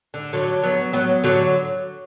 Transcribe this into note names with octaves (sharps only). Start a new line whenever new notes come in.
D3
D3 F#3
F#3 B3
F#3 B3
D3 F#3